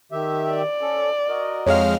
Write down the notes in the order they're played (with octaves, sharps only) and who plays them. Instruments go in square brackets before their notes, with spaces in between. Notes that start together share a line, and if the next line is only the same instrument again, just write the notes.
[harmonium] D#3 G4 E5
[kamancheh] D5
[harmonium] C#4 A4
F#4 A#4 D#5
[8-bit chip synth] F2 G#3 F6 [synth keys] C#5 F5